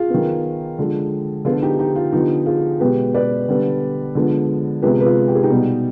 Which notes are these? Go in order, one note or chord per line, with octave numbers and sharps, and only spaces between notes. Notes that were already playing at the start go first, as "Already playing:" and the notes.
Already playing: F4 G#4
D#3 B3
D3 F3 G#3
D3 F3 B3 F4 G#4
D#4 G4
D#4 G4
F4
D3 F3 B3 D#4 G4
F4 G#4
B2 G#3 B3 G4 B4
B4 D5
D3 G3 B3
D3 F3 G#3 B3
C3 F3 G#3 B3 G4 B4
B4
F4 G#4
G4
G#4
D#4 G4
B2 G3 B3